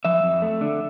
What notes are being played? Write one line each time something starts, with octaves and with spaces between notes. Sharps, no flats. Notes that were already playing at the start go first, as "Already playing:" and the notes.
F3 E5
F2
A3
D3